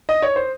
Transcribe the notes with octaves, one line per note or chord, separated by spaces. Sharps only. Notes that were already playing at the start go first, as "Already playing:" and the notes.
D#5
C#5
C5